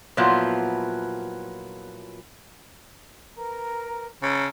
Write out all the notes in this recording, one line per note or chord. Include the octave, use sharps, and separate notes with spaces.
A#2 F3 F#3 B3 E4 F4
A#4 B4 A#5
C#3 A5 A#5 E6